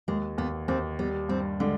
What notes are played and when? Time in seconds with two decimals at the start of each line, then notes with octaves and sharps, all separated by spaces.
0.08 D#2 G#3
0.38 D#2 B3
0.68 D#2 C4
0.99 G3 B3
1.29 G2 C4
1.60 D3 G#3